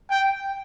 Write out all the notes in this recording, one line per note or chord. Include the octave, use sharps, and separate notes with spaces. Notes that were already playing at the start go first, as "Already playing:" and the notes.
G5